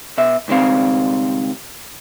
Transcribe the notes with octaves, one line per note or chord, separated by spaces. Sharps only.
B2 E5
C#2 D#3 G3 C4 F5